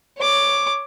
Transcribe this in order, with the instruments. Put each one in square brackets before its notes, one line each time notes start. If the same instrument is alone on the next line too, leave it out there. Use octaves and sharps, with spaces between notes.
[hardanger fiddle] C#5 D6